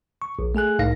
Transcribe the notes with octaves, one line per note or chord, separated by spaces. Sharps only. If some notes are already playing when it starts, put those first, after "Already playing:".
C#6
A#1
A3 G#4 G#5 F#6
C2 A2 D#4 F5 A#6